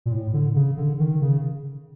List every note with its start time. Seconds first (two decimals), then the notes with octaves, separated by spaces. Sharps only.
0.06 A#2
0.12 A2
0.34 D3
0.56 C#3
0.77 D3
1.00 D#3
1.22 C#3